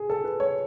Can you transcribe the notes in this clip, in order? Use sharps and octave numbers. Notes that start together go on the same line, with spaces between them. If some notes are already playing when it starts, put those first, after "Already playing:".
Already playing: G#4
A4
B4
C#5